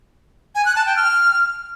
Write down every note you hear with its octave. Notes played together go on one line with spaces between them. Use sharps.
G#5
F#6
A5
G5
F6